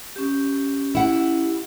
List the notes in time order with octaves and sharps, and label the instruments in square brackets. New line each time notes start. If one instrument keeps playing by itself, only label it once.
[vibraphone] C#4 G4
[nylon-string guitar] E4 F#5